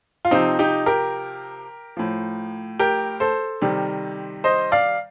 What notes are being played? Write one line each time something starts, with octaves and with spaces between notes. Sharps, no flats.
F4
C3 F3 C4 D#4
D#4 G4
G4 A#4
A2 F3
G4 A#4
A4 C5
C3 D#3 G3
C5 D#5
D5 F5